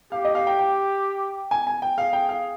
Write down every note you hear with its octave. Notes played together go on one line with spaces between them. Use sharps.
G4 F5
D#5
F5
G5
G5
G#5
G#5
G5
G#4 F5
G5
F5